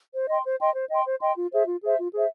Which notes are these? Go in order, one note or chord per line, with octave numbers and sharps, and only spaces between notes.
C5
D#5 G5 C6
C5
D#5 G5 C6
C5
D#5 G5 C6
C5
D#5 G5 C6
F4
G#4 C5 E5
F4
G#4 C5 E5
F4
G#4 C5 E5